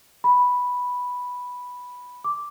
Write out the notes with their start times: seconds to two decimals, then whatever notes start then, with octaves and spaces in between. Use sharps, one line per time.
0.24 B5
2.24 D6